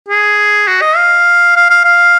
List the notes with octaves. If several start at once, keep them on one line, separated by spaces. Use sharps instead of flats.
G#4
F#4
D#5
F5
F5
F5
F5